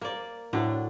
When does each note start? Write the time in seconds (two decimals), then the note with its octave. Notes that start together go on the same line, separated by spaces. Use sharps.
0.01 A#3 D5
0.53 A2 D3 F#3 D4